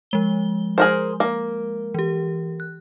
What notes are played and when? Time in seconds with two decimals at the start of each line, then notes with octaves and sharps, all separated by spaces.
0.11 F3 G#3 G7
0.78 G#4 A#4 C5
1.20 A#3
1.94 E3 G4
2.60 F#6